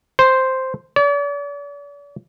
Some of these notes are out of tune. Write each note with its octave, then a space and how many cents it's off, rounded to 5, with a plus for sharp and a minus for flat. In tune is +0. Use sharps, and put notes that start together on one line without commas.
C5 +0
D5 -45